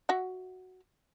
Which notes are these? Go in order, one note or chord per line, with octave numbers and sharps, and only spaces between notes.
F#4 E5 F#5